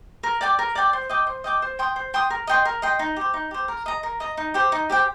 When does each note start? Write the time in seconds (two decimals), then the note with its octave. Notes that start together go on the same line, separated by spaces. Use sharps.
0.23 A#4
0.41 D5 G5 D6
0.59 A#4
0.75 D5 G5 D6
0.93 C5
1.10 D#5 G5 D6
1.27 C5
1.44 D#5 G5 D6
1.62 C5
1.79 G5 C6 D#6
1.96 C5
2.14 G5 C6 D#6
2.30 A#4
2.47 D#5 G5 C6
2.65 A#4
2.82 D#5 G5 C6
2.99 D#4
3.16 G4 C5
3.34 D#4
3.51 G4 C5
3.68 A#4
3.86 D#5 A#5
4.03 A#4
4.20 D#5 A#5
4.37 D#4
4.54 G4 C5 G5
4.72 D#4
4.90 G4 C5 G5